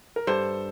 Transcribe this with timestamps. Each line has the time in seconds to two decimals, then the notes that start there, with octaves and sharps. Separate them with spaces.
0.16 A#4
0.27 G2 A4 C5